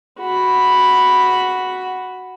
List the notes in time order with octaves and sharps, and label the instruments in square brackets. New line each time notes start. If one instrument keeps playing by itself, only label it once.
[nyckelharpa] F#4 B5